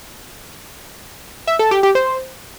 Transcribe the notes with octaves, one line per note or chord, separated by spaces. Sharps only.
E5
A4
G4
G4
C5